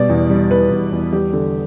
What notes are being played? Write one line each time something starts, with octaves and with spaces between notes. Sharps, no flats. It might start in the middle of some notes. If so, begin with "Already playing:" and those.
Already playing: B2 G3 D5
E2
G3
E2 B4
E2
E2
G3 G4
D3